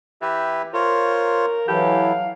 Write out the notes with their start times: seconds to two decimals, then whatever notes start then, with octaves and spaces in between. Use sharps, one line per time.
0.22 E3 G4 B4 E5
0.74 F4 A#4 C5 C#5
1.68 E3 F#3 E4 G4 A4 F5